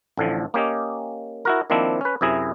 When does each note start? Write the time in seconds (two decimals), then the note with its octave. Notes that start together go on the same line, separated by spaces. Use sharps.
0.18 A1 A2 D3 F3
0.54 A#3 C#4 G4 C#5 D#5
1.45 E4 F#4 A#4
1.70 D#3 F3 A#3 C4 D4 E4
2.01 C#4 B4
2.21 F#2 C3 E4 G#4 A#5